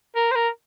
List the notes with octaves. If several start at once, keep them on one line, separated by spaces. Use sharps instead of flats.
A#4
C5
A#4